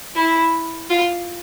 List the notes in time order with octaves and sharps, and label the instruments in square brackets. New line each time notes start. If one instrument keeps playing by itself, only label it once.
[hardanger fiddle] E4
F4